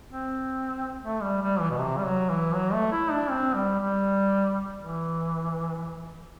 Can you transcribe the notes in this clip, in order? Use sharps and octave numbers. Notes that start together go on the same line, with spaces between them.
C4
A3
G3
G3
E3
B2
C3
G3
F#3
E3
F#3
A3
E4
D4
C4
G3
G3
E3